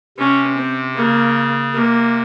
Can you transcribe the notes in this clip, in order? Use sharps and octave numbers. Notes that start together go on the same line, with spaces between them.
C3 C#4
C4
C#3 A#3
C3 A#3